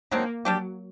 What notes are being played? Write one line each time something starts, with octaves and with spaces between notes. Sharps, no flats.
D3 F#3 A#3 C4 D#4
F#3 G3 D4 G4